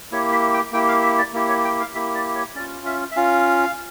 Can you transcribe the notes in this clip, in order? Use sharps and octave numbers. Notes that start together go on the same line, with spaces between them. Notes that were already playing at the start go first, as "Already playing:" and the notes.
A#3 E4 G4 C#5
E5
G5
A#3 E4 G4 G5
F5
E5
D5
A#3 E4 G4
C#5
G5
F5
A#3 E4 G4 E5
D5
C#5
C#4 F4 D5
E5
E5
C#4 F4 F5